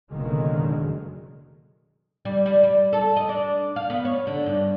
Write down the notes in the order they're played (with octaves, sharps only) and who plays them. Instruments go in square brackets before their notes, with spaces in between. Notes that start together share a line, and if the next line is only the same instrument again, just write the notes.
[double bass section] F#1 B2 D3 D#3 F#3 G#3
[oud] G3
G3
G3
A4
D#5
D4
F5
B3
C#5
D3
G2